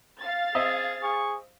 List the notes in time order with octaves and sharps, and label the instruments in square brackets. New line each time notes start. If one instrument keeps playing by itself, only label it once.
[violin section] F5 A6
[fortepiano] C4 D#5 E5 [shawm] G#4
[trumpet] G#4 [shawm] C#6